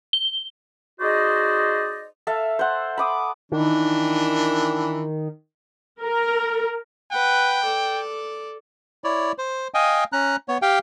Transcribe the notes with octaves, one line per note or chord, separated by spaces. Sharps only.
G7
D#4 F#4 G#4 C5 D5 D#5
A4 E5 F5
C5 F#5
B5 D6 D#6
D#3 E3 D4
A#4
B4 F#5 G5
A4 D5
E4 C#5 D5
C5
D#5 F5 G5 G#5
C#4 A#5 F#6
B3 C#5
G4 F5 G5